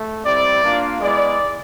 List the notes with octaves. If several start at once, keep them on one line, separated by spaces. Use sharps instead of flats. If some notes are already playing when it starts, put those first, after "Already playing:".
Already playing: A3
G3 C4 E4 D5
A#3 D4 F4
G#3 B3 E4 D5